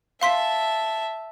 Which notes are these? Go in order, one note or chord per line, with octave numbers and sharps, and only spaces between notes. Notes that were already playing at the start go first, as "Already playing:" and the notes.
E5 F5 A5 C6 B6